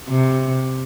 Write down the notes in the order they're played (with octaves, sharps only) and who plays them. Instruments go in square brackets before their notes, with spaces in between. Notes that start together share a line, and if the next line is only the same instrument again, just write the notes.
[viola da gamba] C3